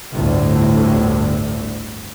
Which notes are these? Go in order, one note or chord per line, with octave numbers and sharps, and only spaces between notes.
G1 D2 A2